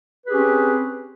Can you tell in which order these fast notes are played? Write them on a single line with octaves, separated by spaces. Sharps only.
B4 G#4 G4 C#4 C4